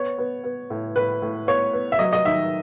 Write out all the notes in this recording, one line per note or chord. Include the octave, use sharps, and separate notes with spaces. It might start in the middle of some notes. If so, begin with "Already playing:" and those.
Already playing: B3 C#5
B3
B3
A2
A2 B4
A2
B3 C#5
B3
E5
F#3 D#5
D#5
D#3 E5